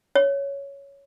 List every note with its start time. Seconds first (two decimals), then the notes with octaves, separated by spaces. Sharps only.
0.15 C#5